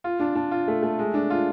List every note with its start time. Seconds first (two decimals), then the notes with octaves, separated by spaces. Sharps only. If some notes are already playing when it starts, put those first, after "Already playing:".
0.04 F4
0.20 D4
0.35 D4
0.51 F4
0.68 A3
0.83 A3
0.99 G#3
1.14 D4
1.30 F4